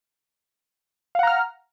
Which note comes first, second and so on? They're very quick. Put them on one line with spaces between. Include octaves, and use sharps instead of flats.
F5 F#5 A#5 F6